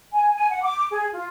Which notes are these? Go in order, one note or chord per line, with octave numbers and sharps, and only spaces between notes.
G#5
G#5
F#5
D6
G#4
F4